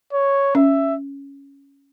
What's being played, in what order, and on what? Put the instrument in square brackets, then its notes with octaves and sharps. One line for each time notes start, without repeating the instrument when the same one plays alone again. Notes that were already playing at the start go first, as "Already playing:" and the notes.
[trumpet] C#5
[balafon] C#4 [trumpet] E5